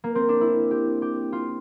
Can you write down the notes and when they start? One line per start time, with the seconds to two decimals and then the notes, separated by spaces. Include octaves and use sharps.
0.04 A#3
0.15 C4
0.29 D4
0.41 E4
0.71 G4
1.02 G4
1.33 F4